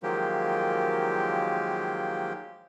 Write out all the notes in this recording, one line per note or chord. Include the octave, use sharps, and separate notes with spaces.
D#3 F3 F#3 G#3 A#3 G4